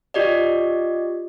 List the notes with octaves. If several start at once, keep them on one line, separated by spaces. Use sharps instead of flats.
F4 G4 D5 D#5